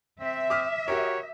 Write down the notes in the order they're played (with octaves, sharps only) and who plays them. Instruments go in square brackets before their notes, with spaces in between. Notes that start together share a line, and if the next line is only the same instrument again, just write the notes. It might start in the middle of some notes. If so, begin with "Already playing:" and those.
[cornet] C4 [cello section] E5
[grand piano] D6 D#6 F6
[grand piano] F#4 G4 A#4 [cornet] C#5